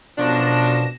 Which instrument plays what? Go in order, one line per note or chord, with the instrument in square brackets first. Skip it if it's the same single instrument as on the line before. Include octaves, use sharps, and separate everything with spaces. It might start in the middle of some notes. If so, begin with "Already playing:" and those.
[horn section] F#2 F3 D4 [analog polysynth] B2 A#6 E7